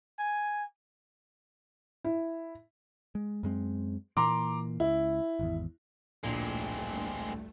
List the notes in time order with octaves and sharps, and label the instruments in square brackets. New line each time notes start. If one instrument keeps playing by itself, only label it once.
[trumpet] G#5
[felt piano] E4
[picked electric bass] G#3
F#2 G#3 C4
[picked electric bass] A#2 E3 A#3 [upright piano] A#5 C6 D6
[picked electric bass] C#2 [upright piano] E4
[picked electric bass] G#1 E2
[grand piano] D1 A#1 [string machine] G2 A3 [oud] A#2 [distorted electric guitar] G#3 C4